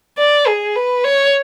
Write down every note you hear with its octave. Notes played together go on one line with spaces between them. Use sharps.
D5
G#4
B4
C#5